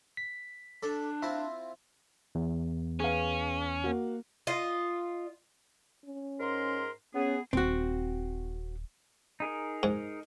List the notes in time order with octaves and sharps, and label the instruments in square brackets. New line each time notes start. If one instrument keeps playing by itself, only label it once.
[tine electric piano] B6
[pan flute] D4 [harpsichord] A4 D5
[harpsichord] C4 E4 F4 [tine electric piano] E5
[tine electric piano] E2
[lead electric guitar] C#4 [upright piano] G#4 B4 F5
[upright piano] A#3 F#4
[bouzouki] F4 D#5
[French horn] C#4
[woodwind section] G#2 A#4 C6
[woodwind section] B3 G#4 [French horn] C#4
[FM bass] D#1 [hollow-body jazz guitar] C4 F#4
[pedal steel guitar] D#4 G#4 A#4
[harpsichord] G#2